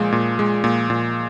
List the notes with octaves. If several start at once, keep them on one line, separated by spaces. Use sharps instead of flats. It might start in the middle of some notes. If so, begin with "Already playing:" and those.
Already playing: A#2 F3 G#3
A#2
G#3
A#2
A#2